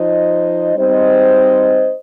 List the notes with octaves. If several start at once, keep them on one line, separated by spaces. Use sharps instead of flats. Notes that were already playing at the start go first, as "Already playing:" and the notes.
Already playing: F3 D#4 C5 D#5
G3 C4 D#4 C5 D#5